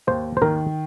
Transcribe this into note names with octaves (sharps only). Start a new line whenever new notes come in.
D#2 C5
C5
D#3 A#4